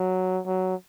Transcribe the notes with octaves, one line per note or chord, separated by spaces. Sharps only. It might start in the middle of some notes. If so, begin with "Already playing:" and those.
Already playing: F#3
F#3